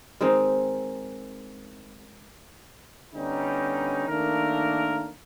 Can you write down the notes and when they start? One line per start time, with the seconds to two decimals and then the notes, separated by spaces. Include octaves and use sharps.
0.21 D#3 G#3 C4 D#4
3.14 D3 G3 B3 C#4 D#4
4.08 D#3 A3 A#3 D4 A#4